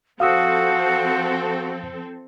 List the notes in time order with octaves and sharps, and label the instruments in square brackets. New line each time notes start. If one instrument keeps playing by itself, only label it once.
[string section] F3 C4 A4 [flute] F#4 [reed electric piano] F5 D#6 E6